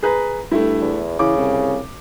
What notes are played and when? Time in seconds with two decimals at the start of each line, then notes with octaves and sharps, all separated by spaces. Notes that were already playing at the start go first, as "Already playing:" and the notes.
0.03 G#4 B4 A#5
0.51 G2 A3 E4
0.82 E2
1.19 C#3 E3 D6
1.37 C2